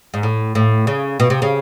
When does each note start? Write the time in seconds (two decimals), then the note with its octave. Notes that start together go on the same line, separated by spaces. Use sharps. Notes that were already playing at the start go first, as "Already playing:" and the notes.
0.14 G#2
0.23 A2
0.55 A2
0.87 C#3
1.20 B2
1.30 C3
1.42 C#3